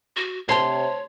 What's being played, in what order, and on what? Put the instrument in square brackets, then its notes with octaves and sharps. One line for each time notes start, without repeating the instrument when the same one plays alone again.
[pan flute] F#4
[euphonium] C3 [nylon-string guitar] C5 A5 [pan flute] C#5 [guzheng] C6